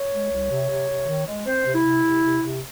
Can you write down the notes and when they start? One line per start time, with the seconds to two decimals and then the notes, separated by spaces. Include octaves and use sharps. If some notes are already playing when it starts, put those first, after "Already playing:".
Already playing: C#5
0.12 G#3
0.31 C2
0.50 C3
0.69 C3
0.88 C3
1.07 D#3
1.27 G#3
1.45 C4 C5
1.65 C3
1.75 E4
1.84 C3
2.04 C3
2.23 C3
2.42 C3